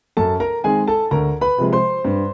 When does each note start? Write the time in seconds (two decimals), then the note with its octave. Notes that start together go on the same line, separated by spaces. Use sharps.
0.17 F#2 A4 A5
0.40 A#4 A#5
0.64 D#3 G#3 C4 G#4 G#5
0.88 A4 A5
1.11 D2 A#4 A#5
1.41 B4 B5
1.58 C3 F3 G#3
1.73 C5 C6
2.05 G2